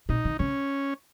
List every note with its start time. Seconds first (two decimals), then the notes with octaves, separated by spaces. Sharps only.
0.09 A#2 D#4
0.25 D#3
0.39 C#3 C#4